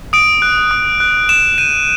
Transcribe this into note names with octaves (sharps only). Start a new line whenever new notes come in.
D#6 D7
F#6
D#6
F#6
D#6 E7
G6 D#7